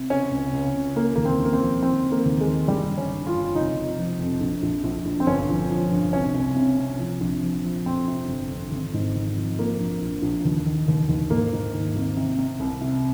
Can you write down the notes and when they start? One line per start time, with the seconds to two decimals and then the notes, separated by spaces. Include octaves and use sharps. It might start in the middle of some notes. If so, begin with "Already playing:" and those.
Already playing: C3
0.10 C#3 C#4
0.32 C#2
0.53 C#2
0.74 C#2
0.96 C#3 A#3
1.16 D#2 A#3
1.25 C4
1.39 C#3
1.45 A#3
1.53 C4
1.61 F3
1.83 D#3 C4
2.04 D#3
2.12 A#3
2.25 D#2
2.40 G#3
2.47 D#3
2.68 G1 G3
2.90 G1
2.98 C#4
3.12 G2
3.26 F4
3.34 G1
3.55 F1 D#4
3.76 F1
3.98 F3
4.20 F2
4.41 A#1
4.63 A#1
4.84 A#1
5.06 A#1
5.20 C4
5.27 G1 C#4
5.49 F3
5.70 F3
5.91 G2
6.13 C2 C#4
6.34 C2
6.56 C3
6.79 C3
6.99 F3
7.21 A#1
7.43 F3
7.64 F3
7.86 F2 C4
8.08 C3
8.28 G1
8.50 F2
8.71 G#1
8.94 G#2
9.15 G#1
9.37 F3
9.58 F3 A#3
9.80 A#1
10.01 A#1
10.22 A#1
10.45 D#2
10.66 D#3
10.88 D#2
11.09 D#2
11.30 G#2 A#3
11.53 G#2
11.73 D#3
11.96 G#1
12.17 C3
12.38 C3
12.60 C2
12.81 C3